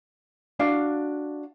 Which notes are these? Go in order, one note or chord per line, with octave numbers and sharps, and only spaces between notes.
D4 F#4 F5